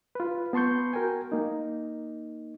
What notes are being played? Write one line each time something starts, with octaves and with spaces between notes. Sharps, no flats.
F4 B4
B3 A5 C6 C#6 G6
F#4 A#4 G5 G#5
A#3 D#4